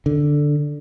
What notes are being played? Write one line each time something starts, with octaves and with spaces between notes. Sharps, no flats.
D3